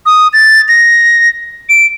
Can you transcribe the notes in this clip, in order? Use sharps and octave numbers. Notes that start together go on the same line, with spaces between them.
D#6
A6
A#6
D7